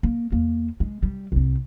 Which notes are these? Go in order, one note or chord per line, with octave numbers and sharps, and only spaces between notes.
A#3
E2 A#3
G#3
G3
C2 C4